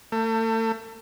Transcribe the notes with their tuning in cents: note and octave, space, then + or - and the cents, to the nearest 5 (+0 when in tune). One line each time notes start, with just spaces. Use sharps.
A3 +35